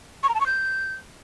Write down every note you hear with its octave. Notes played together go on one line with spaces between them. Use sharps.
C#6
A#5
A5
C#6
G6